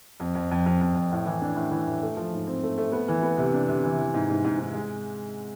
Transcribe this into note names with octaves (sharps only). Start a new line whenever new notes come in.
F2
F2
F2
F2
F2
F2
A2
E3
D4
A2
E3
A2
A3
F3
G#2
C4
A3
A3
B3
E3
B3
C3
D4
C3
E3
E3
G#2
G#2
G#2
G#2
G#3